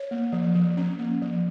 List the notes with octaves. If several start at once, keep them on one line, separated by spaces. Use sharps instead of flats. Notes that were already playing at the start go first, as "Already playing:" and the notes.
Already playing: C#5
A#3
F3
F3
C#4
A#3
F3